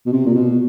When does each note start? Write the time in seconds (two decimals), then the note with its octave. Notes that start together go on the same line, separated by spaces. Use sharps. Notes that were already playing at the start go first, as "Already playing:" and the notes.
0.06 B2
0.12 C3
0.26 A#2
0.35 B2